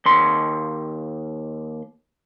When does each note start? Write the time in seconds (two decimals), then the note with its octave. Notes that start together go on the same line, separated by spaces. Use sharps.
0.06 D#2 C6